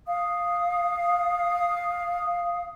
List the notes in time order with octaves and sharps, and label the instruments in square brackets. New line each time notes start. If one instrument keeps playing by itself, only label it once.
[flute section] F5 D#6